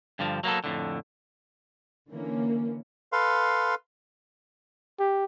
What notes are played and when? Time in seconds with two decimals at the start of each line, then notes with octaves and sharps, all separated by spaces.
0.19 G2 D3 F3
0.44 F#3 A#3 B3 A4
0.64 F2 A2 D3
2.10 D3 E3 A#3 C#4
3.13 A4 B4 F5 C6
4.99 G4